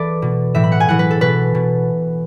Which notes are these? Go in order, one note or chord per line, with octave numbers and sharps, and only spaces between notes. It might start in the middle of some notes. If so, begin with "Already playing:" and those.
Already playing: E3 A4 B4 D5
B2
A2 E3 E5
B5
F#5
G#5
A2 E3 F#5
B4
A4
B2 B4
B2